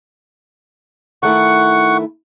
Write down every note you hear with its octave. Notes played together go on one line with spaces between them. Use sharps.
D#3 A3 E4 F#5 C#6